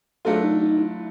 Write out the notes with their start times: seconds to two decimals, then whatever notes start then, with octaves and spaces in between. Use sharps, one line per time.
0.25 F#3 A3 D4 F4 A4
0.43 D#4
0.61 D#4
0.79 E4